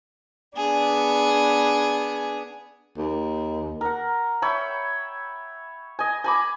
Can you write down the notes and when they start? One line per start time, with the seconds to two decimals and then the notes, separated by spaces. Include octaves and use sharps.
0.57 B3 D4 G#4
2.97 D#2
3.81 A#4 F#5
4.42 C#5 E5 G5 B5
5.99 D#5 G#5
6.24 G#5 B5 D6